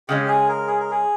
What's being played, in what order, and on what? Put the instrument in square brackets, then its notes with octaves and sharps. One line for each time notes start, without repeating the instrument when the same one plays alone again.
[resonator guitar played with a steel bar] C#3 G#3 C#4 [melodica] G4
[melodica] G#4
A#4
G#4
A#4
G#4